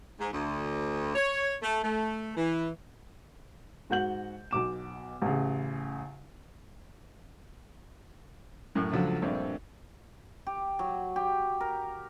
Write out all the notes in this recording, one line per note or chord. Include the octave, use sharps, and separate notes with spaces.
G#2
D2
C#5
A3
A3
E3
G#2 F#4 F#5 G6 F#7
B1 B2 D6 E7
A1 C#3
F#2 A2
C#2 D3 F3 F#3 A3
A#1 G2 A3 C4
G4
F#3
G4
A#4